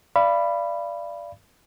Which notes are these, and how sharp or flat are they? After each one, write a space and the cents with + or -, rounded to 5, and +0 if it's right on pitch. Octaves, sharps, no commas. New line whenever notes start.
D5 +0 F5 -35 B5 +0